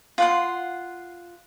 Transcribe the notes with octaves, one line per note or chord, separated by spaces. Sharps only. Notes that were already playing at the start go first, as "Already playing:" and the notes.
F4 F#5 C6